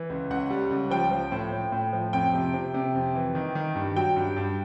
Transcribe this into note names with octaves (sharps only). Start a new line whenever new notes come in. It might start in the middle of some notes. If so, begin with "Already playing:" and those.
Already playing: E3
C#2
C#2 F#5
G3
C#2
F3 G5
F3
A2
A2
A2
F3
F2 G5
C3
C3
C3
F2
E3
D#3
D#3
G2
F#3 G5
G2
G2